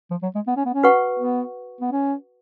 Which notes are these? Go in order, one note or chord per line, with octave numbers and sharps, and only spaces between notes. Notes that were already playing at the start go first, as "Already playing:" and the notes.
F3
F#3
G#3
B3
C#4
B3
C#4
F#4 B4 F#5 C#6
B3
B3
C#4